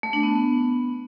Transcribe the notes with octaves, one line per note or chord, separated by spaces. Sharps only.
A3
D4
B3